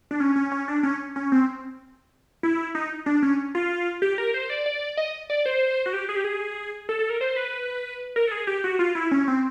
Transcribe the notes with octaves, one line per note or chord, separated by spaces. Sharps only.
D4
C#4
C#4
C#4
D4
C#4
C#4
C4
E4
D#4
D4
C#4
F4
G4
A#4
C5
D5
D5
D#5
D5
C5
F#4
G4
G#4
G4
G#4
A4
A4
A#4
C5
B4
A#4
A4
G#4
G4
F#4
F4
E4
C#4
C4